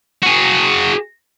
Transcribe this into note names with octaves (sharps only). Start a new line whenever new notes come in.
F#4 G#4